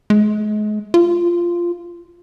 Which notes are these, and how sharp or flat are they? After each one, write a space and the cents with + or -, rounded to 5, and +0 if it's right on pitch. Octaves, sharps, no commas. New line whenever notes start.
G#3 +35
F4 -10